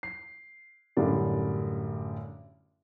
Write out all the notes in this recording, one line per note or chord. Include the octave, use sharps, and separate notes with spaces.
C7
A1 F#2 D3 G3 D5